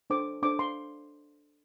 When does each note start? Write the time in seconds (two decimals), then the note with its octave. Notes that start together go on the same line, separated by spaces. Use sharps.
0.10 D4 A4 C5 D6
0.43 D4 A4 C5 D6
0.59 C6